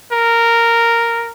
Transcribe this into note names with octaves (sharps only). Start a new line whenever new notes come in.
A#4